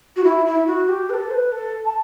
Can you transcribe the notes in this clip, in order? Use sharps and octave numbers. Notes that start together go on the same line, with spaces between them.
F#4
E4
E4
F#4
G4
B4
A4
C5
B4
A4
A5